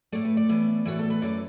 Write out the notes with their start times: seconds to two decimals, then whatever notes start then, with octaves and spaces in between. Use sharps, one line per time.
0.12 A2 A3 D5
0.25 B4
0.37 D5
0.49 A2 E3 B3
0.85 A2 E3 A3 F#4
0.99 A4
1.10 B4
1.22 F#2 E3 A3 D5